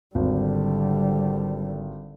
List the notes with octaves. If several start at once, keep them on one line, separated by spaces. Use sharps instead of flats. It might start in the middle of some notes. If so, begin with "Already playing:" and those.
G#1 D3 G3